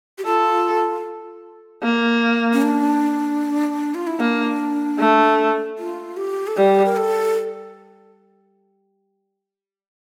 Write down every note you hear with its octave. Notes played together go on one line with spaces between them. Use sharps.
G4
F4 A4
A#3
C#4
D4
F4
E4
A#3 D4
A3
F4
G4
A4
G3 G4
A#4
A4